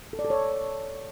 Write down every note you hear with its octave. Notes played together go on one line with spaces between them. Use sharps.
A4
D5
A4
C#5